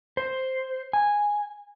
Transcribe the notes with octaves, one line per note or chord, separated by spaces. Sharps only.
C5
G#5